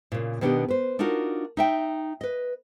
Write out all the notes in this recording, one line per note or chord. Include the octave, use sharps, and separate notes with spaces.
A#2 C#3
B2 D#3 B3 D4 F#4 G4
B4 C5
D4 D#4 F4 F#4 A#4
D#4 E5 G5
B4 D#5